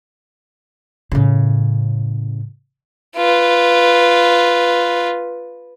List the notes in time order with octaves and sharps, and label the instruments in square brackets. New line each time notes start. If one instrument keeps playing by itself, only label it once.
[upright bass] A2 C#3
[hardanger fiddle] F4 B4